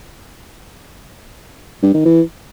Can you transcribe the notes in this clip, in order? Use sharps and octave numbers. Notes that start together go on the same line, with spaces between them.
G2
D#3
E3